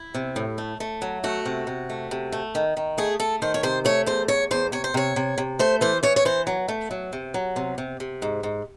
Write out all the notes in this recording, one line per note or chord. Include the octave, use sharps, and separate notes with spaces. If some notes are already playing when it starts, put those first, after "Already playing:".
Already playing: E4
C3
A2
A3
A3
F#3
A3 F#4
C3
C3
A3
C3
A3
D#3
D#3
A3 G#4
A3 A4
D#3 C5
C#5
C3 C5
A3 C#5
E2 C5
E2 C#5
E2 C5
C3 C#5
C5
C3 C#5
C3
C3
A3 C5
E3 C5
E3 C#5
C#5
E3 C5
F#3
A3
F#3
C3
F#3
C3
C3
C3
G#2
G#2